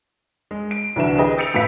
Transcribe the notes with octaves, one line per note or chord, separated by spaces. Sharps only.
G#3
D7
C2 D3 E3 D4 F#4 E7
G4 G#4 B4 D#5 G5 D#6
E6 G6 A6 C#7 D7 F7
F#2 A2 B4 F5 B6